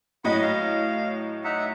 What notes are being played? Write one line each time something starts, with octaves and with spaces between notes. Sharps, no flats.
A2 F#3 D#5 F#5 B5
F5
D#4 E5 F#5